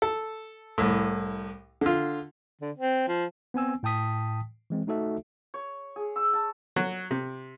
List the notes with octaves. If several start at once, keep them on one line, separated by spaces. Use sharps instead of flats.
A4
C2 A2
D3 F4
D3
C4
F3
B3 C4 G#5 E6
A2 G5 A5 D#6 B6
E3 G#3 C4
A3 D#4 F#4 A4 E5
C#5
G#4
E6
A5
F#3
C3